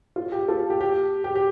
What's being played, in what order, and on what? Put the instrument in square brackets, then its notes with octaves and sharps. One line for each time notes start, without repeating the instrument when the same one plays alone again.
[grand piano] F4
G4
F4 A4
G4
G4
G4
G4